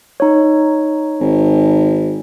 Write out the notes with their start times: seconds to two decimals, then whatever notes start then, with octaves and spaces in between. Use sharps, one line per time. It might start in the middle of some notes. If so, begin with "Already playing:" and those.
0.20 D#4 C#5
1.20 G#1